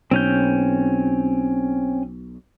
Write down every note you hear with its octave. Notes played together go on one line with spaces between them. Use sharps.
B1 C4 C#4 G6